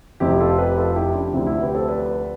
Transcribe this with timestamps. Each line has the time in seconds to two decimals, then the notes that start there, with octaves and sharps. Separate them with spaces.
0.20 F1 F2 C3 F3 E4 G4
0.40 F4 A4
0.58 G4 B4
0.77 F4 A4
0.96 E4 G4
1.14 D4 F4
1.33 D2 C3 F3 E4 G4
1.46 E4 G4
1.61 G4 B4
1.75 A4 C5
1.88 B4 D5